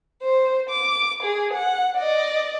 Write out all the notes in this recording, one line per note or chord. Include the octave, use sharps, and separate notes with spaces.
C5
D6
G#4
F#5
D5 D#5